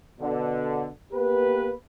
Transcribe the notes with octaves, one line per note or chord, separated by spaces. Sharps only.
B2 D3
A#3 B3 G4 B4